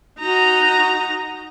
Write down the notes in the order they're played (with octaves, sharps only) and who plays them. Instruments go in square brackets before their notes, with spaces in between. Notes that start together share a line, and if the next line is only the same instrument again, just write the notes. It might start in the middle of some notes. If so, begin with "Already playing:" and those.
[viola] D#4 A#5 [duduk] F#4